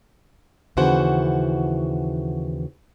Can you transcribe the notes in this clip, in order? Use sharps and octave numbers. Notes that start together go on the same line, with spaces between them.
D#2 C#3 E3 F#4 C5 F#5